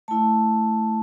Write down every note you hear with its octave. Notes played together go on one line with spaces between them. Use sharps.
A3 E4 A5